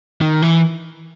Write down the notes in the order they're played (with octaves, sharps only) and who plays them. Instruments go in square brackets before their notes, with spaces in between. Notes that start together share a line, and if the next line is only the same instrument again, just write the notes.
[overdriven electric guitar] D#3
E3